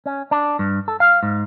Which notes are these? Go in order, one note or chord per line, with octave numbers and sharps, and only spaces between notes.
C#4
D4
G2
A4
F5
G#2